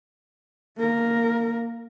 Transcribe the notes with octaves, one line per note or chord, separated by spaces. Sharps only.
A#3 A#4